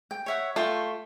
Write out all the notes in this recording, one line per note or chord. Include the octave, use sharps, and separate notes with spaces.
G5
C#5 E5 F#5
A3 F4 G5 C#6